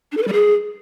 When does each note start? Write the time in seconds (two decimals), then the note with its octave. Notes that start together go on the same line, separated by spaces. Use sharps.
0.12 D4
0.17 A4
0.22 B4
0.28 G3
0.33 G#4